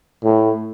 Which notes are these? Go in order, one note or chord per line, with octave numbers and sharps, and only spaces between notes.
A2